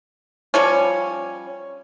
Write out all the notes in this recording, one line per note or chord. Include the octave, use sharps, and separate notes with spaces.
F3 G3 C#4